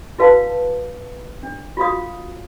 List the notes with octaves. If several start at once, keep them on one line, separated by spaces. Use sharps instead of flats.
E4 F#4 B4 F5 A5
D4
F4 F#4 F5 D#6